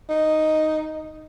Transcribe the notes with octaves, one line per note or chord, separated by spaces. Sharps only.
D#4